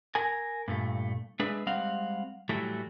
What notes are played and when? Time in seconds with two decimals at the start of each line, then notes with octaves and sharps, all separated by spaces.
0.15 A#4 G#5
0.68 G2 A#2 A3
1.40 G#3 D4 G#4 B4 E5
1.67 G3 G#3 C4 F5 F#5
2.49 A2 E3 F#3 G3 A3